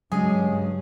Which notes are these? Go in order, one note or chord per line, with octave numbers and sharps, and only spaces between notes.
G2 C#3 F#3 G#3 D4 G#4